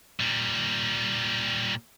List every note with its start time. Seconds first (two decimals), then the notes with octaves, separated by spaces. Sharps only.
0.20 A#2 G3